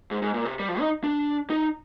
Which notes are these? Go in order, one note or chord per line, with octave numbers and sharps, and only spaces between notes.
G#2
G#2
A#2
C3
G3
F3
D#4
D4
D#4